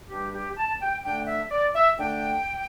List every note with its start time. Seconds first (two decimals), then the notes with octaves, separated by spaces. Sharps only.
0.09 G2 G3 D4 G4
0.34 G4
0.57 A5
0.81 G5
1.04 D3 A3 D4 G5
1.27 E5
1.50 D5
1.74 E5
1.98 D3 A3 D4 G5